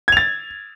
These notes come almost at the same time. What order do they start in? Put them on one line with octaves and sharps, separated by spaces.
G#6 F7 A6